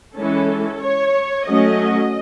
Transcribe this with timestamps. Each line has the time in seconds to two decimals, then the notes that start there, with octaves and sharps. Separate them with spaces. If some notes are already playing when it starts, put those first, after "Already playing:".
0.16 E3 G#3 C#4 A4
0.82 C#5
1.47 F#3 A3 C#4 D#5